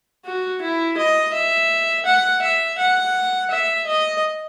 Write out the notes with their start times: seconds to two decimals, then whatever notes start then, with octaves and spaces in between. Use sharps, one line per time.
0.25 F#4
0.62 E4
0.97 D#5
1.33 E5
2.06 F#5
2.42 E5
2.78 F#5
3.51 E5
3.87 D#5